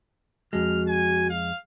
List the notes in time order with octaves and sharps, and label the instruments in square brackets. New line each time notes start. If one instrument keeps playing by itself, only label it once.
[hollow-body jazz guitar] F2 G#3 [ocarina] F#4 [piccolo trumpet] F6
[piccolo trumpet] G#5
F5